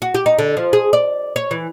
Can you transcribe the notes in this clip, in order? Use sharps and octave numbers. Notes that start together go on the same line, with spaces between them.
F#4
G4
D#4
D3
F3
G#4
D5
C#5
E3